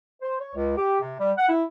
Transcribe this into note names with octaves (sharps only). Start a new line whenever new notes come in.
C5
C#5
C#2
G4
C3
G3
F#5
E4